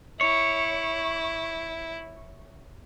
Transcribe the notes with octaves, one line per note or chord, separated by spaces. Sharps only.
E4 C#5